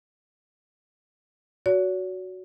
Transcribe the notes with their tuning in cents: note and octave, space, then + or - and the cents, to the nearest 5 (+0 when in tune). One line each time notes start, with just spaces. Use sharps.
F#4 +0 C#5 +45